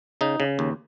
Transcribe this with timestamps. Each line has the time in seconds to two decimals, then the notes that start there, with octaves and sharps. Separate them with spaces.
0.21 C#3 D#4
0.40 C#3
0.59 D#2